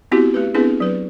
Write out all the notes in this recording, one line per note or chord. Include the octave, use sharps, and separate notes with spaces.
B3 C4 E4 F#4 G4
A3 G4 B4
B3 C4 D4 E4 G#4 B4
F#3 B4